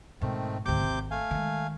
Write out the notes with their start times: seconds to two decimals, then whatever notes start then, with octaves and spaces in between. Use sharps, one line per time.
0.21 G#2 B2 D#3 A3 C4
0.66 D2 G#2 C3 D6 G6
0.80 G#1 D#2
1.11 A3 F5 G#5
1.31 D#3 G#3